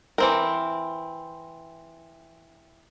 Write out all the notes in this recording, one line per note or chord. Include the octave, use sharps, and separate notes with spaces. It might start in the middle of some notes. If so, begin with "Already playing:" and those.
E3 C4 A#4